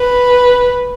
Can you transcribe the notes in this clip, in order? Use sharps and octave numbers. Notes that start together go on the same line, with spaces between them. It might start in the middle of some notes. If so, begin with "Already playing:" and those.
Already playing: B4